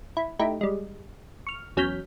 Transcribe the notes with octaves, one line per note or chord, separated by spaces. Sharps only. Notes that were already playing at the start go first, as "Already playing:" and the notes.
E4
A3 D#4 E4 G4
G3 G#3
C#6 F6
E2 F#3 C#4 F6 G6 B6